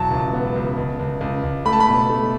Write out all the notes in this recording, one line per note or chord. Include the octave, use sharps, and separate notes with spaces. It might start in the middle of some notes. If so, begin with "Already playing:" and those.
Already playing: E1 F#3 A5
C#2
B3
C#2
C#2
C#2
C#2
C#2
A3 B5
A5
B5
B2
A3